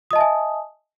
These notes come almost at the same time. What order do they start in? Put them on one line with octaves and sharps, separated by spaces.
D#6 D#5 A5 E5 G#5